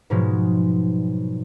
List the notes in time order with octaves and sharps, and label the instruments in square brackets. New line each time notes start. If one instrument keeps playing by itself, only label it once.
[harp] G#2 B2 F3 F#3 G#3